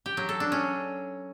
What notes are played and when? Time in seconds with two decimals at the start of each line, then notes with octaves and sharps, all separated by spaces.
0.06 G4
0.17 F#3
0.29 A4
0.40 D4
0.52 C#4